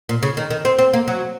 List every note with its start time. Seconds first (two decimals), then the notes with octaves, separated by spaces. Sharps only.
0.09 A#2
0.23 C#3
0.37 D#3
0.50 D#3
0.65 C4
0.79 C4
0.93 A#3
1.08 F#3